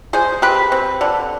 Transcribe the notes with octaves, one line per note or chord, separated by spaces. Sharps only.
G#3 G#4 C5
C4 G4 B4
C4
D3